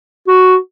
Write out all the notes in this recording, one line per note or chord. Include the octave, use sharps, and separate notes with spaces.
F#4